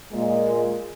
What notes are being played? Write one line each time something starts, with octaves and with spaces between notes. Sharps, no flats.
A#2 G#3